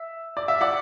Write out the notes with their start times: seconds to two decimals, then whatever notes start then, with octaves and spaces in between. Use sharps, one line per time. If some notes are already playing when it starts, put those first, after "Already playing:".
Already playing: E5
0.37 D5
0.48 E5
0.61 D5 F#5